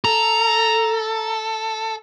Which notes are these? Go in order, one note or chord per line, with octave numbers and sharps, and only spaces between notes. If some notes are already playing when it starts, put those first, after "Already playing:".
A4 A#5